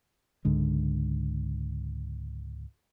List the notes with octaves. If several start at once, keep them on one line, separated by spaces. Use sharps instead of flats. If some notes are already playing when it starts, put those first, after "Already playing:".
C#2 G#2 D3 G#3